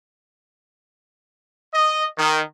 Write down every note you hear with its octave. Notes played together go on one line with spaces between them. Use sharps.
D#5
D#3